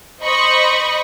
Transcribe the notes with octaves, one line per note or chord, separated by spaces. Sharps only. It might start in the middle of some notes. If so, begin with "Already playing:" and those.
C5 D#5 B5 C#6